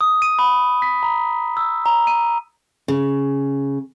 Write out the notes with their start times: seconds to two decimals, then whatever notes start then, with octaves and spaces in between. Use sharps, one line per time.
0.01 D#6
0.22 D#7
0.39 B5
0.82 B6
1.03 A#5
1.57 E6
1.86 A#5
2.07 D#7
2.88 C#3